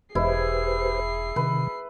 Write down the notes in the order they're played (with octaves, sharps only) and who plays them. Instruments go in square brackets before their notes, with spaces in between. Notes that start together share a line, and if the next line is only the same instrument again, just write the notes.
[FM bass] E1 [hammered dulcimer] E4 [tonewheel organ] G4 B4 C5 [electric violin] G#4 C7
[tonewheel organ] C3 D#3 [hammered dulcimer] B4